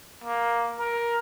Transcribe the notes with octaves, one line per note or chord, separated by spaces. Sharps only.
A#3
A#4